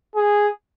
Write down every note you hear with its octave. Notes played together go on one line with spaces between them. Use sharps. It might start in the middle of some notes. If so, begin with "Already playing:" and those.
G#4